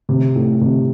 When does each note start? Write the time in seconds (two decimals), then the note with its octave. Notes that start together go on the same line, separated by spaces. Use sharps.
0.09 C3
0.35 A2
0.61 C3